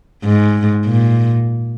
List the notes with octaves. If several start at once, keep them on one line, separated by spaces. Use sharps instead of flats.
G#2
A#2